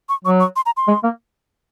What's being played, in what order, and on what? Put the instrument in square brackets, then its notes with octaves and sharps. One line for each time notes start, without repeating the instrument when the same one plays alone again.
[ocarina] C#6
[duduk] F#3 [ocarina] C#6
[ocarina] C#6
C6
A#5
C6
[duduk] G#3
A#3